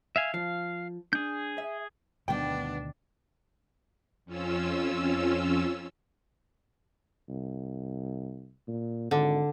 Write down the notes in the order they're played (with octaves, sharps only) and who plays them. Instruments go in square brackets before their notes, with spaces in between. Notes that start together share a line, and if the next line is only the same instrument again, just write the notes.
[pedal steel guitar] E5 F5 G#5
[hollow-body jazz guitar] F3 [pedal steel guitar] F5
[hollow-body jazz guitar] D4 [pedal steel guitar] G#4 G6
[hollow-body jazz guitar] E5
[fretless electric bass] D2 B2 D#3 [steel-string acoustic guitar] G2 B3 [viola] D4 [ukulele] G5
[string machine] F2 C#4 F4 E6
[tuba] C2
A#2
[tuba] G#1 [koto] D3